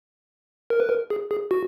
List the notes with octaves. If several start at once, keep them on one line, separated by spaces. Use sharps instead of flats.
A#4
B4
A#4
G#4
G#4
F#4